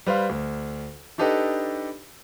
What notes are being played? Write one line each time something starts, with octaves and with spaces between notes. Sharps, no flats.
G3 B4 C5 F5
D2
D4 D#4 G4 A4 B4 D#5